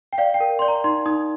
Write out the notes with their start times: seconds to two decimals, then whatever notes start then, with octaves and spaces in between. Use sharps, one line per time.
0.13 G5
0.18 D5 F5
0.34 G5
0.40 A#4
0.59 D5 C6
0.68 A#5
0.84 D#4 C6
1.06 D#4 D#6